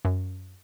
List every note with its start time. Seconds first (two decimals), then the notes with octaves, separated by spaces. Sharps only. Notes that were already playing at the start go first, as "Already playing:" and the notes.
0.05 F#2